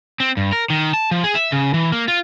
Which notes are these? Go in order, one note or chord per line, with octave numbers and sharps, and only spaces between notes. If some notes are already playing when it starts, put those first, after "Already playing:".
C4
G2
A#4
D#3
A5
F3
G#4
E5
C#3
E3
A#3
F4